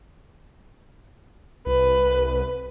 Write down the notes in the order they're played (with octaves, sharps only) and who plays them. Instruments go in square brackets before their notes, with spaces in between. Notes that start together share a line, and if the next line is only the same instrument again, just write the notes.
[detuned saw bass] C2 [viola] B4